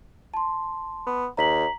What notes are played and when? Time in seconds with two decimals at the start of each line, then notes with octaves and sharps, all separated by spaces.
0.34 A5 C6
1.06 B3
1.37 D#2 A#5 B6 F#7